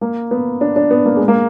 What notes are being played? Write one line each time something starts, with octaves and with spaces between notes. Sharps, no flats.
A#3
B3
D4
D4
B3
A#3
G#3
A#3